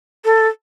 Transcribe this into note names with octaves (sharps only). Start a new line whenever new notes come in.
A4